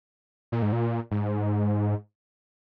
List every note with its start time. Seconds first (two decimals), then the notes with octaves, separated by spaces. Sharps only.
0.52 A#2
0.62 G#2
0.73 A#2
1.11 G#2